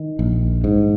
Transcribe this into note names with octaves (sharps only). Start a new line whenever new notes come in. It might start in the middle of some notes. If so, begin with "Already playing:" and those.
Already playing: D#3
A#1
G#2